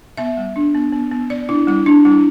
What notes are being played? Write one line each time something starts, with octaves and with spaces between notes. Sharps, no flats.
B3 E5
G3
D4
B3
B3
B3
B3 D5
D4 E4
G3 E4
D4
G3 E4